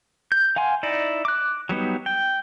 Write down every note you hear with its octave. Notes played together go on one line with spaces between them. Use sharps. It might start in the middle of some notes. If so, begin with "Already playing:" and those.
G6
F5 F#5 G#5 C6
D#4 E4 D5
D6 F#6
F#3 G3 B3 D#4
G5